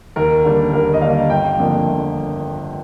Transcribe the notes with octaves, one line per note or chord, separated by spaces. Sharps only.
D#2 A#4
D3 G3 A#3
D#2 A#4
D#5
D3 G3 A#3 F5
G1 G5
F2 D3 F3 A#3
G1